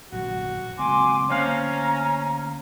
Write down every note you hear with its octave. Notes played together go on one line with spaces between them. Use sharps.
A#1 F#2 F#4
F#1 G#3 C4 G#5 C6 D6
D2 A#3 C#4 C5 F5 A#5